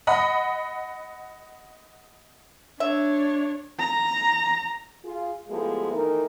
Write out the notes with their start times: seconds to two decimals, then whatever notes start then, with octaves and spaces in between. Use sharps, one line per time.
0.07 D#5 F#5 B5 D#6
2.80 D4 C#5 E5
3.79 A#5
5.04 F4 G#4
5.49 F3 G#3 A3 B3 E4 G4
5.92 D#3 E3 A3 D#4 A#4